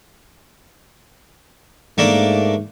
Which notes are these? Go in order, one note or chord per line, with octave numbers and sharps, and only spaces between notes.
G#2 A3 A#3 D4